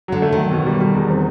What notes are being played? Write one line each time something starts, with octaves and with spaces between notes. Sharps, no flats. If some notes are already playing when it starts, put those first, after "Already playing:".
D3 F#3
A3
D#3 F#3
B2
G3
G3
E2
C4